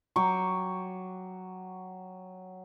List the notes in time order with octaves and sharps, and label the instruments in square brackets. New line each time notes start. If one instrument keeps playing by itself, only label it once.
[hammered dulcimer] F#3 G5 C#6 D6